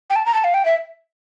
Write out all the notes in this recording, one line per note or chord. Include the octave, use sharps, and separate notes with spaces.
G5
A5
A#5
A5
F5
G5
E5